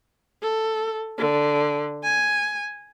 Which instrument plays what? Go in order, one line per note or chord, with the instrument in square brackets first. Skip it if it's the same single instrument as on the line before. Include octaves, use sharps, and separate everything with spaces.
[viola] A4
D3
G#5